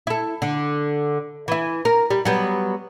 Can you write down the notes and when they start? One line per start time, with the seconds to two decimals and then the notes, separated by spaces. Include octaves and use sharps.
0.07 E4 A4
0.42 D3
1.48 E3 E4
1.85 A#4
2.10 G3
2.25 F#3 G3 B3